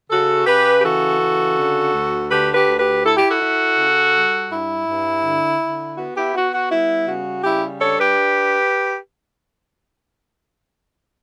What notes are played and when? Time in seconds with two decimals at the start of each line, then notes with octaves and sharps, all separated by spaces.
0.10 C#3 F#4 A4
0.46 C#3 G4 B4
0.79 G4
0.83 E3 F#4 A4
1.20 C#3
1.56 D3
1.93 D2
2.30 D3 G4 B4
2.54 G4 B4
2.66 D2
2.78 G4 B4
3.04 E4 A4
3.16 G4
3.29 F#4 A4
3.41 E4
3.77 C#3
4.14 G3
4.50 G2 E4
4.87 G2
5.24 D3
5.60 D3
5.97 B3 F#4
6.15 E4 G4
6.34 B3 F#4
6.52 F#4
6.71 G3 E4
7.07 C#3 F#4
7.44 G3 E4 G4
7.81 D4 A4 C#5
7.99 G4 B4